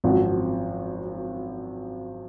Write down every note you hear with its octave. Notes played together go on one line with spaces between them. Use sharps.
G#1 F#2 F3 C4 F#4